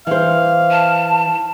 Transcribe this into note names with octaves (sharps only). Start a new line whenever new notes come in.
E3 C5 F5
A5